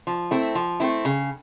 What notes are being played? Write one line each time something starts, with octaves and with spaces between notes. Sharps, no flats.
F3
A3 C4 E4
F3
A3 C4 E4
C#3